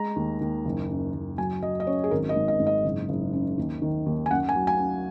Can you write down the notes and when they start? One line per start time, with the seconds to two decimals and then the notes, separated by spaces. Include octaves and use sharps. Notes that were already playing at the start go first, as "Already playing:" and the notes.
Already playing: G#3 A#5
0.16 D#2
0.41 D#2
0.65 F#1
0.90 F#2
1.14 F#1
1.38 F#3 G#5
1.63 F#3 D#5
1.80 D#5
1.87 F#2 C#5
2.04 G#4
2.11 G#1 A#4
2.29 D#5
2.36 G#2
2.48 D#5
2.60 G#2
2.67 D#5
2.84 F#1
3.09 F#1
3.33 C#3
3.58 D#2
3.82 D#3
4.06 D#2
4.26 G#5
4.30 F#2 F#5
4.49 G#5
4.55 F#3
4.67 G#5
4.80 F#2